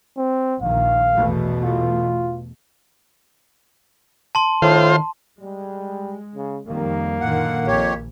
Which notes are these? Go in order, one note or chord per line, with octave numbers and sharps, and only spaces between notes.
C4
A#1 D#3 F5
E2 B2 A3
F4
A5 C6
A2 D#3 F4 C5
G3 G#3
C#3
F2 D#3 G3 A#3
F#2 A#2 D3 D#3 F#5
A#1 F2 G4 C#5